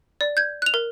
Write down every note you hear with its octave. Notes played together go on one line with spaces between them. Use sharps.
D5
G6 G#6
F#6 F7
A#4